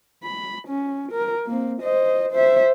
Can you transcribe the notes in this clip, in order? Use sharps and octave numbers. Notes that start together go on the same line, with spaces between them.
B5
C#4
A#4
A#3 C4
C5 D#5
C5 E5